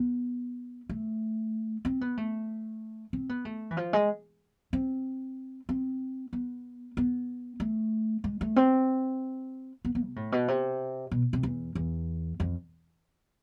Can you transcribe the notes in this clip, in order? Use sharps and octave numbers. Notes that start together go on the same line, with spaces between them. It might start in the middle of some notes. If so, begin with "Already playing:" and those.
Already playing: B3
A3
C4
B3
A3
C4
B3
A3
E3
F3
G#3
C4
C4
B3
B3
A3
G#3
A3
C4
B3
B3
C3
A2
B2
C3
B2
C3
E2
E2
F2